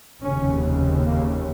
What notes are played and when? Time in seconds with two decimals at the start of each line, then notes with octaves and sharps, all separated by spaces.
0.22 F1 D#2 C#3 C#4
1.06 A#3